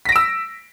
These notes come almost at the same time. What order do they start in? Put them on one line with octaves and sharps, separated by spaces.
B6 A#6 D7 E6